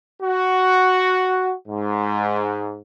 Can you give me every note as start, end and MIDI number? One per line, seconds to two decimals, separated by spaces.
0.23 1.53 66
1.68 2.79 44